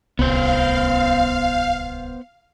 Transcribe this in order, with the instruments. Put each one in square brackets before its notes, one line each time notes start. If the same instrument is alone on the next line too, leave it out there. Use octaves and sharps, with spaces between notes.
[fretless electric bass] D1 C2 [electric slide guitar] B3 C5 [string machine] F5